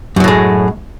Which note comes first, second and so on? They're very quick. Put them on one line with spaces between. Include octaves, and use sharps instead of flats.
F#2 F#3 A2 G#3